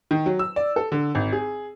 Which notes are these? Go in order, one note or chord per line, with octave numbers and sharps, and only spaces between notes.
D#3
F#3
E6
D5
A4
D3
G#1
G#4